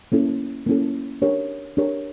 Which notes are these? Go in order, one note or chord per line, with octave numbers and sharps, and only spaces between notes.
A#3 C#4 E4 A4
A#3 C#4 E4 A4
D4 G4 A#4 C#5
D4 G4 A#4 C#5